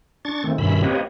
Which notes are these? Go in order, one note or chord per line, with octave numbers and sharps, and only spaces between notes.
D4 C#6 A6
D#3 A3 C4
G2 B2 D#3 C#4 E5 B5
A#3 C4 G4 B4 C#5 D#5